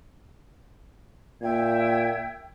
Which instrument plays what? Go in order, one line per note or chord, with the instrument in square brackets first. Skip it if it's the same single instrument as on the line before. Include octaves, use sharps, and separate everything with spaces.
[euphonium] A#2 [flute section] E5 G5 G#6